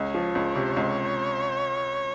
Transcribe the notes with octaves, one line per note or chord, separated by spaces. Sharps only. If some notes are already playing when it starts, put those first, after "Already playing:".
Already playing: C#2 C#5
F3
C#2
C3
C#2